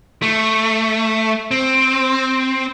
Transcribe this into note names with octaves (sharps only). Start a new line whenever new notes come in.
A3
C4